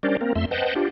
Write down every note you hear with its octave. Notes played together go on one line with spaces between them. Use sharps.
G3 C#4 D4 A#4 C5 D5
A#3 C4 A#4
F2 A3 E5 C6
B4 C5 D#5 F#5 G5 A5
D4 F4 G4